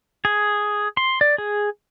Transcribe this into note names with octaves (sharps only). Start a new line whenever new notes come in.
G#4
C6
D5
G#4